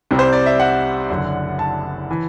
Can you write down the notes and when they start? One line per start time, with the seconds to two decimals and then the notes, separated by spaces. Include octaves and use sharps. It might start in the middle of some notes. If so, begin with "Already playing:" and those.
0.11 C2 C3 G3 C4
0.19 C5
0.33 D5
0.46 E5
0.60 F#5
1.09 F#1 F#2 D3
1.59 A5
2.11 E3